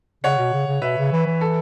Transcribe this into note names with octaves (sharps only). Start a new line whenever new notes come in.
C#3 C#5 F#5
B2
C#3
C#3
B2 B4 E5
C#3
E3
E3
A4